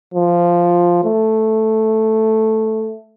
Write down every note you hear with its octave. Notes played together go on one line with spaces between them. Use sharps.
F3
A3